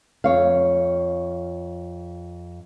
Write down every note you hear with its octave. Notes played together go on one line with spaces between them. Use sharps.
F2 C#5 F5